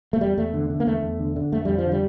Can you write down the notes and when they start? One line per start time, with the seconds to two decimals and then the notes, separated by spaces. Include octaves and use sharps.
0.13 A3
0.21 E2 G3
0.37 E2 A3
0.54 D3
0.70 D3
0.80 A#3
0.87 E2 A3
1.03 E2
1.19 D3
1.36 D3
1.52 F2 A3
1.65 F2 G3
1.78 F3
1.85 D3
1.92 G3